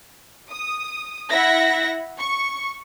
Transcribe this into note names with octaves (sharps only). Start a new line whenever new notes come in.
D#6
E4 E5 F#5 A#6
C#6